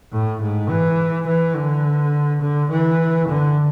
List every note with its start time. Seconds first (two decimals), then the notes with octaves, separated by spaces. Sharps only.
0.13 A2
0.41 G#2
0.69 E3
1.27 E3
1.55 D3
2.41 D3
2.70 E3
3.28 D3